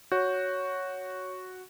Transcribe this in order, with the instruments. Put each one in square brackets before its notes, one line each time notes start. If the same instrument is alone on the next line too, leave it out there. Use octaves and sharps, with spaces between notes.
[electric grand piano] F#4 [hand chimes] C#5 G6